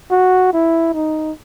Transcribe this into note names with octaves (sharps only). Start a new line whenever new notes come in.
F#4
E4
D#4